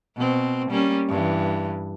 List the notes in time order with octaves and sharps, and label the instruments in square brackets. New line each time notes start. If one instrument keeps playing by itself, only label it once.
[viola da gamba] B2 C4
G3 A#3 C#4
G2 E3